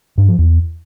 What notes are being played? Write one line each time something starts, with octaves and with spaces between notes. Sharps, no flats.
G2
F3
E2